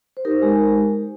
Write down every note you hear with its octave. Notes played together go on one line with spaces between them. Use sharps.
C5
D#4 G4 A#4
G#3